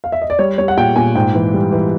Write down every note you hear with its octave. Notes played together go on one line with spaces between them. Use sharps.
F5
E5
D#5
D5
G3 C#5
G3 C#5
F#5
A#2 G5
A#2 G#5
G#2 G5
E3
G3
E3